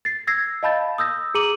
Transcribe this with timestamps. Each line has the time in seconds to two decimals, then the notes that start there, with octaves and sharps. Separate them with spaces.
0.05 A6 C7
0.27 E6 G#6 A#6 C7
0.63 D#5 F5 A5 B5 G6 A6
0.98 D#6 E6 G6 A#6
1.34 G#4 A#5 D6 D#7 F#7